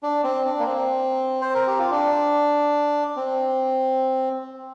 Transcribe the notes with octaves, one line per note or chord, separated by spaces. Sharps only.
D4
C4
D4
A#3
C4
C5
A#4
G4
F4
D4
C4